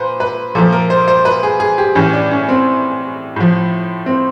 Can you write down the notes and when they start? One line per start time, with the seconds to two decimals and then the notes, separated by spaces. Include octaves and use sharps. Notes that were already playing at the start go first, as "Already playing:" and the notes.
Already playing: A#2 B4 C5
0.20 B4
0.55 A#2 F3 A4
0.72 A#4
0.90 C5
1.08 C5
1.25 B4
1.43 G#4
1.60 G#4
1.78 G4
1.95 A2 E3 C#4
2.13 D4
2.31 C#4
2.49 C4
3.36 A2 F3
4.06 C4